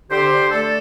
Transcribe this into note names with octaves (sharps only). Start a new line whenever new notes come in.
D3 G4 C5
D3
A3 A4 D5